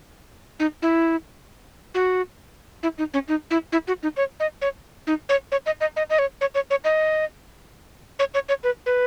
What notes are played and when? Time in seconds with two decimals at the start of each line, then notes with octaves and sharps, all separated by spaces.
0.60 D#4
0.82 E4
1.95 F#4
2.83 E4
2.98 D#4
3.14 C#4
3.28 D#4
3.51 E4
3.72 E4
3.88 F#4
4.03 D#4
4.17 C#5
4.40 D#5
4.62 C#5
5.07 D#4
5.29 C#5
5.52 C#5
5.66 D#5
5.81 D#5
5.96 D#5
6.10 D#5
6.19 C#5
6.41 C#5
6.55 C#5
6.70 C#5
6.84 D#5
8.19 C#5
8.34 C#5
8.49 C#5
8.64 B4
8.86 B4